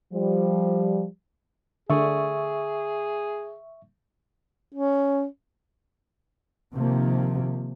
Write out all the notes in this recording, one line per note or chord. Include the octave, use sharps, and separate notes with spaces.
F3 G3
D3 G#4 E5 C#6
C#4
C3 D#3 F3 A#3